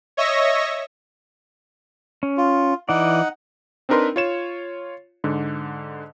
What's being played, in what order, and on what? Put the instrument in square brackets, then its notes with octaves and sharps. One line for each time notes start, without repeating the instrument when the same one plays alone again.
[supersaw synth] C#5 D#5 E5 C#6 E6 A#6
[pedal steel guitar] C#4
[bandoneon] F4
[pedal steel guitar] E3 D5 [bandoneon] D#4 F#5
[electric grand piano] C4 D4 D#4 A#4 B4 C6
F4 C#5 E7
G#2 D3